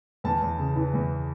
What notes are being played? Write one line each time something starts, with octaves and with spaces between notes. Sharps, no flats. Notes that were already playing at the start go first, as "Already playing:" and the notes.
E2 A5
E2
C#3
E3
E2